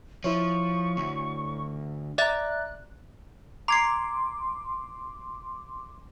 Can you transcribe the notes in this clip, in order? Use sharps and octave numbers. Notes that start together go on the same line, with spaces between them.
F3 E4 C5 C#5 C#6
D2
D5 E5 A#5 D6 F#6 A6
A#5 C6 D6 G#6 C7